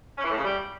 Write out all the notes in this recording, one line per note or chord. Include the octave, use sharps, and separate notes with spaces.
C#4
E3
A2
C#3
G3